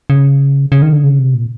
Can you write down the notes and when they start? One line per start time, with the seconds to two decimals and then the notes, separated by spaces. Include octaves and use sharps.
0.10 C#3
0.72 C#3
0.82 D#3
0.93 D3
1.04 C#3
1.19 C3
1.34 A#2